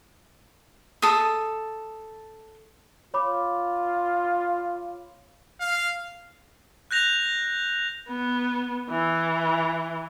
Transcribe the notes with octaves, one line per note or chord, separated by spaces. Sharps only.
A4 D#6
F4 C#5 B5 D6
F5
F#6 G6 A#6 F7
B3
E3